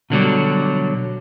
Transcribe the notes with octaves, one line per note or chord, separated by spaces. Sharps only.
B2 D3 F#3 G3